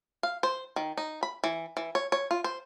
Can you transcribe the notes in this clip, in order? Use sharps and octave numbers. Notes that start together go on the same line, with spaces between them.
F5
C5
D#3
D#4
B5
E3
E3
C#5
C#5
F4
C5